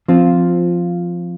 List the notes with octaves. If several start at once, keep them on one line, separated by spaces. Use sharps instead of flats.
F3 C4 F4